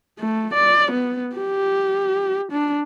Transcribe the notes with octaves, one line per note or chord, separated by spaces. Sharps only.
A3
D5
B3
G4
D4